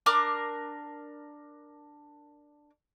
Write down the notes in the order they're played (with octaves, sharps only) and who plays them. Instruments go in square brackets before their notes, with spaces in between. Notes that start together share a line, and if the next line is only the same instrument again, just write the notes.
[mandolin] D4 A#4 D6